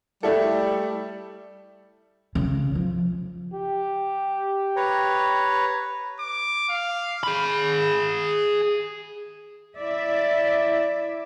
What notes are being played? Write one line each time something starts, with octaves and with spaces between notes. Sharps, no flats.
G3 A3 E4 A4
C#3
F3
G4
B4 C#5 A#5
D6
F5
G#4 B5
E4 D5 E5